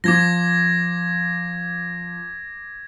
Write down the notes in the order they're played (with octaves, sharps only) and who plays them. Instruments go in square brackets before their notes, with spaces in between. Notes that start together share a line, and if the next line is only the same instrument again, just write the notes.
[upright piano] F3 [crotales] D6 G#6 A#6